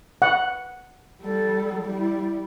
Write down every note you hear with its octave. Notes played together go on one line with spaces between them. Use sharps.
F#5
G3 A4
G3 E4